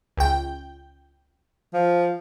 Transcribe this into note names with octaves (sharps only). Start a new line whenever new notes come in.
C#2 G5
F3